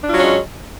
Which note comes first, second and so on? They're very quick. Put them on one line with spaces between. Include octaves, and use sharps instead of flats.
D4 F4 F#3 C#4 G#3